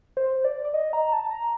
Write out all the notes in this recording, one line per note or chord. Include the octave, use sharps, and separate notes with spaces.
C5
D5
D5
D#5
A#5
A5
A#5